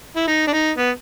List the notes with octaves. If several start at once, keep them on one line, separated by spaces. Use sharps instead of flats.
E4
D#4
D4
D#4
B3